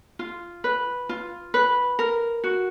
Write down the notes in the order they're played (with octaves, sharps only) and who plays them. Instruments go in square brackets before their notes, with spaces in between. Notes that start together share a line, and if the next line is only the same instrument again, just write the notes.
[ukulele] F4
B4
F4
B4
A#4
F#4